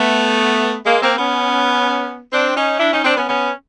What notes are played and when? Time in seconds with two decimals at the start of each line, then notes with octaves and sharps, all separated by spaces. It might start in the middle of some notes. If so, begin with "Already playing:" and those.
Already playing: A3 B3
0.85 G#3 A#3
1.02 A#3 C4
1.17 B3 C#4
2.31 C4 D4
2.55 C#4 D#4
2.79 D4 E4
2.92 C#4 D#4
3.04 C4 D4
3.17 B3 C#4
3.29 B3 C#4